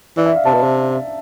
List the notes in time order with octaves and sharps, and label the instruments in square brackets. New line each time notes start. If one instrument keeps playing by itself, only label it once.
[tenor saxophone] E3 [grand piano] D5
[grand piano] E5
F5
[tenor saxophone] C3 [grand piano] A5
[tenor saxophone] B2
C3